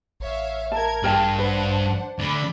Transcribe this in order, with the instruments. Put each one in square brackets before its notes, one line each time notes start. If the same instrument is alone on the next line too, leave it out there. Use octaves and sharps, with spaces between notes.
[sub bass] A1 [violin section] C#5 E5 F5
[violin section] A#4 G#6 [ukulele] A5
[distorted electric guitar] G2 [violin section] F4 G#4 [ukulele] A#4 G5 A5
[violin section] D4 C5 F#5 [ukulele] B4
[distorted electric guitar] D2 D3 [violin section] D5 B5